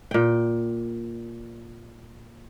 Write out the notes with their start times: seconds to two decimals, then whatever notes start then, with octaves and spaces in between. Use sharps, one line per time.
0.11 A#2 G5